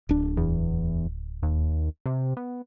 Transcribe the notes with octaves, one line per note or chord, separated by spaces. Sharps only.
D1 D4
E2
D#2
C3
B3